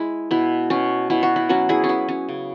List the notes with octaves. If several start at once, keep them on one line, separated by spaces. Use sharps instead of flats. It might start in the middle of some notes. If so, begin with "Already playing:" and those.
Already playing: G#3 E4
B2 E4
B2 C#4
B2 E4
F#4
E4
F#3 C#4 F#4
E4 G#4
C#4
B3 E4
C#4
C#3